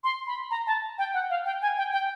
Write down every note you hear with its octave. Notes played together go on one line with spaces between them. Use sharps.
C6
B5
A#5
A5
G5
F#5
F5
G5
G#5
G5
G5